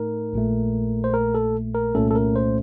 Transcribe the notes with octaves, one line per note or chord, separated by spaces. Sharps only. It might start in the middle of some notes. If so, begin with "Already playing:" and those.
Already playing: A2 A3 D#4 A#4
A#1 A#2 A3
C5
A#4
A4
A#4
C2 A#2 A3 C#4 A4
A4
A#4
C5